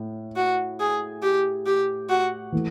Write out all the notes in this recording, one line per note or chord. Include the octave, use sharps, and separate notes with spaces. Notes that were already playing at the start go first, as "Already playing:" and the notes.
Already playing: A2
F#4
G#4
G4
G4
F#4
E3 A3